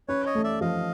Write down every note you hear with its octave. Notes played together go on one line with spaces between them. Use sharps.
C#4 B4 C#5
C#5 D#5
A3
D5 E5
F3 D#5 F5